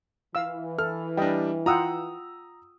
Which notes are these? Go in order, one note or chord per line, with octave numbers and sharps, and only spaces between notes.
E3 F5 E6
A4 F6
G3 D4 D#5 G5
F4 F#5 G5 A#5 D#6 E6